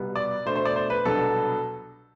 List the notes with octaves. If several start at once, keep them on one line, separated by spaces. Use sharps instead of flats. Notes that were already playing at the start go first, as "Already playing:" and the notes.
Already playing: C2 B2 G3 B3
D5
B2 A3 D4 C5
C5
D5
C5
B4
C2 B2 F#3 B3 D4 A4